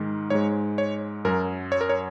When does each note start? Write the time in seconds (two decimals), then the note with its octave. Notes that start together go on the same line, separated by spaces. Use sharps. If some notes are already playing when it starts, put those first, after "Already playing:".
Already playing: G#2 D#3 G#3
0.30 G#2 G#3 C#5
0.78 C#5
1.25 F#2 F#3 A#4
1.72 C#5
1.81 A#4
1.89 C#5